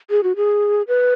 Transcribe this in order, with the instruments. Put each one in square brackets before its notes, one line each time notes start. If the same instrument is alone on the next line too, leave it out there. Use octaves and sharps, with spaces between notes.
[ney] G#4
F#4
G#4
B4